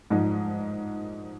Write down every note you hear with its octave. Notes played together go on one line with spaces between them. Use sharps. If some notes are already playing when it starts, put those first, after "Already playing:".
G#2 F3 G#3 D#4